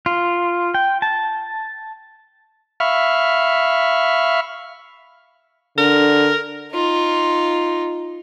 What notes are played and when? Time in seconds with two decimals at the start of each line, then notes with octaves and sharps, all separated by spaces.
0.06 F4
0.74 G5
1.02 A5
2.80 E5 F5 B5 C#6 F6
5.78 D3 A#4
6.73 D#4 F4